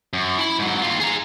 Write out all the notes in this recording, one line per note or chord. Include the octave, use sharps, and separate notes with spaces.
F#2
E4 B5
G#2 F#3
D#2 F4
G#4 A#5